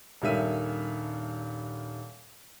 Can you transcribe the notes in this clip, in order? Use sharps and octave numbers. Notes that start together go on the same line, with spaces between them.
D#1 G2 D#3 E5 D#7